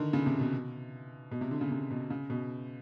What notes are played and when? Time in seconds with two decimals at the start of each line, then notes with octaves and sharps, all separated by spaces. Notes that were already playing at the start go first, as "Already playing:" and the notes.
Already playing: D3 D#3
0.13 C#3
0.26 C3
0.39 B2
1.31 B2
1.41 C3
1.51 D3
1.61 C#3
1.71 C3
1.91 B2
2.10 C#3
2.30 B2